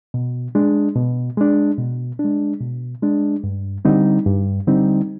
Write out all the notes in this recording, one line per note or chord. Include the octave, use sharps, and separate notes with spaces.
B2
G#3 D4
B2
G#3 D4
B2
D4
G#3
B2
G#3 D4
G2
D3 G3 C4 D#4
G2
D3 G3 C4 D#4